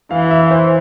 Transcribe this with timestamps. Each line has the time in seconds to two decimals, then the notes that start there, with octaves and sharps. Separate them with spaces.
0.11 E3 F5
0.31 E5
0.51 C5